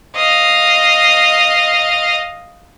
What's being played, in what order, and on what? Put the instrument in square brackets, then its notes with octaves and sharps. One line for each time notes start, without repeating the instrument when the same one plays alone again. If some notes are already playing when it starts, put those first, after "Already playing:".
[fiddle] D#5 F5